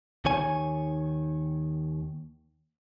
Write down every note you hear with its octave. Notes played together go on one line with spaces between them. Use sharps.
D#2 D#3 C#5 G#5